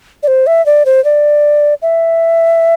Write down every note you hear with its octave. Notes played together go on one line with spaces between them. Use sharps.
D5
C5
E5
D5
C5
D5
E5